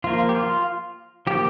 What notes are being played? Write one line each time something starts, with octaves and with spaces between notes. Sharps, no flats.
F3 A#3 F4
G4
F4
F3 A#3 G4